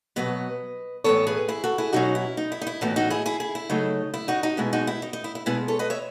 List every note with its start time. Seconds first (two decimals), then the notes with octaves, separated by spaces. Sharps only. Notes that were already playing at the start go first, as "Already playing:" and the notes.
0.16 B2 F#3 B3 B4 D#5
1.04 A2 E3 B3 A4 C#5
1.27 G#4 B4
1.49 E4 G#4
1.64 F#4 A4
1.78 E4 G#4
1.93 B2 F#3 C#4 D#4 F#4
2.15 E4
2.37 D#4
2.52 E4
2.62 D#4
2.67 E4
2.81 A2 E3 B3 D#4 F#4
2.96 D#4 F#4
3.10 E4 G#4
3.26 E4 G#4
3.40 E4 G#4
3.55 E4
3.70 C#3 F#3 A3 D#4
4.14 E4
4.28 D#4 F#4
4.43 D#4 F#4
4.57 B2 G#3 B3 E4
4.73 D#4 F#4
4.87 E4
5.02 D#4
5.13 D#4
5.24 E4
5.35 E4
5.46 B2 G#3 B3 E4 G#4
5.68 A4 C#5
5.79 B4 D#5
5.90 C#5 E5